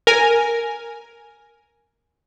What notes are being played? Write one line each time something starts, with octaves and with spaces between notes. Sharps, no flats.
A#4 G#5